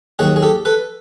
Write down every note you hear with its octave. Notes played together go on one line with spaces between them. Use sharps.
D#2 D#3 F#3 F#4 G#4
G#4
G4 A4
A4 B4